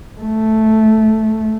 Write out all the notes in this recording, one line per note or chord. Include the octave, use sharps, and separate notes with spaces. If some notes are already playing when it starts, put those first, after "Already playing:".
A3